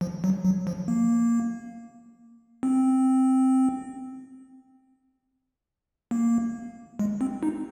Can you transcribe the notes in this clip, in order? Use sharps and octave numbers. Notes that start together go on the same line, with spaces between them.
F3
F#3
F#3
F3
A#3
C4
A#3
G#3
C4
D#4